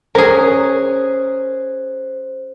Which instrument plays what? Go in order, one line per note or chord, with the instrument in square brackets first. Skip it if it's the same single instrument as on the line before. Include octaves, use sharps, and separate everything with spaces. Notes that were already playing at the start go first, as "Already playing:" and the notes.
[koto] C#4 G#4 [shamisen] A#4 [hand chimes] C5